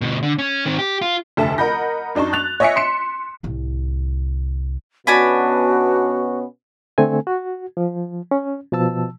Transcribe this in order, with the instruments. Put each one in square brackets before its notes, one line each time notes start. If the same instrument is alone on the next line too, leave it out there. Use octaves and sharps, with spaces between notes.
[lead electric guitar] D2 B2
D3
C#4
D#3 C4
G4
F4
[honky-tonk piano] F1 D2 A4 E5 A5
A#4 D#5 F#5 B5 G6 A#6
F#2 D4 D#4 A5 C#6
F#6 A6 F7
C#5 D#5 E5 G#5 B6 C#7
C6 B6 C#7 E7
[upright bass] C2 A2
[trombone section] B2 B3 C#4 [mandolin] D4 G#5 B5 [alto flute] F#4
[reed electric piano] D3 A3 C4 A4 G#5
F#4
F3
C#4
B2 F3 A5 E6